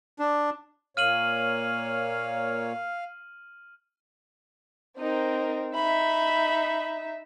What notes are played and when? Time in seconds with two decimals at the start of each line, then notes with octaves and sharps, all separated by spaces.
0.19 D4
0.97 A#2 A#3 C#5 F5 F6 D#7 F#7
4.99 C4 D#4 A#4
5.75 D#4 E5 B5